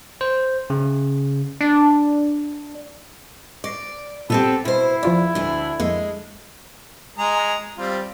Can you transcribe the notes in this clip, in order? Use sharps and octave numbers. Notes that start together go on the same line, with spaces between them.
C5
C#3
D4
D5 C#6 A#6 C7
A#2 B3 C4 G4 A4
B2 E4 C5
E2 F3 F4 D5
D2 D4
F2 G#3 A#3
G#3 G#4 A#5
G3 C4 F4